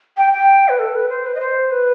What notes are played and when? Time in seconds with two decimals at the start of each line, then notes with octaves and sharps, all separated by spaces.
0.17 G5
0.33 G5
0.68 B4
0.79 A4
0.95 B4
1.09 C5
1.26 B4
1.35 D#5
1.40 C5
1.71 B4